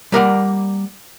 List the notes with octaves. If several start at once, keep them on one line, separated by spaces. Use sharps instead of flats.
G3 A#3 A#4 D5 D#5 F#5